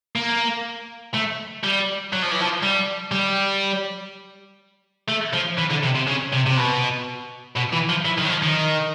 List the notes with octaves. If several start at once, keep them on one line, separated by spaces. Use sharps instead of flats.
A#3
A3
G3
F#3
F3
E3
F3
G3
G3
A3
F3
E3
D3
C3
C3
C#3
C3
C3
B2
B2
E3
F3
E3
D#3
F#3
F3
D#3